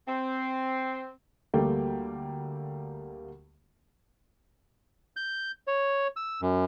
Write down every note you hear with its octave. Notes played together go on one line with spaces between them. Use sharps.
C4
D2 G3 A3 A#3 G5
G6
C#5
E6
F#2